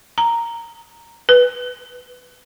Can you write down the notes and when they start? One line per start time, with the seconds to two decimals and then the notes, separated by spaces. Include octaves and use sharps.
0.18 A#5
1.29 B4